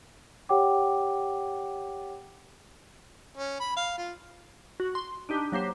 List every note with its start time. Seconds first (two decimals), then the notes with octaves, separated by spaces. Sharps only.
0.49 G4 C#5 F#5 G5 D6
3.37 C#4
3.60 B5
3.77 F5
3.97 F4
4.80 F#4
4.95 C6
5.29 D4 D#4 G4
5.52 F#3 A#3 G4 C5